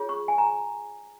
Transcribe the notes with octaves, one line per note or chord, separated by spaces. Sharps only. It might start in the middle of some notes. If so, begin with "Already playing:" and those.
Already playing: F4 G#4 C#5
C#6
G#5
A#5